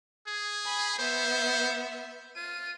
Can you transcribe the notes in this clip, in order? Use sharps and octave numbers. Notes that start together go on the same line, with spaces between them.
G#4
G#5 B5
B3 C5 E5
F4 D#7